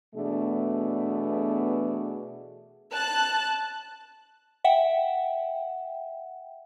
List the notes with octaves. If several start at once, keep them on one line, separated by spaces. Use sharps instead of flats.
B2 E3 A3 B3 D4 G#4
A5 F#6
E5 F#5 G5